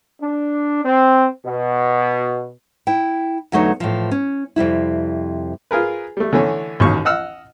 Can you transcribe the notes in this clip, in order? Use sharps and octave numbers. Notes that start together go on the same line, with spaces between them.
D4
C4
B2
E4 G5
E2 D3 F#3 A3 D#4 C#5
A2 E3 F3
C#4
F2 C3 G3 E4
F4 G#4 A#4 B4
G3 A3
D3 E3 A3 C#4
A1 D#2 D#3 F#3 C#6
D#5 F#5 E6 F6